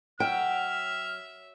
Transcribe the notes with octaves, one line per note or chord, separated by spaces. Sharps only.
F#3 E5 G5 F6